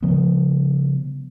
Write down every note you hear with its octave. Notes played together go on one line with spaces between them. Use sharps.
C#3 F3 G3 B3